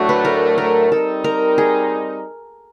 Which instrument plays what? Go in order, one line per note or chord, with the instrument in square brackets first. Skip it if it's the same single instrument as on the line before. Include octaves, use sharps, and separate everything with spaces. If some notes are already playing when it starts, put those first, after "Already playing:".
Already playing: [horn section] A2 F#3 A3 D4 [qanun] F#4
[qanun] B4
A#4
A#4
[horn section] G3 C4 D#4 [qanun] A4
[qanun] A#4
G#4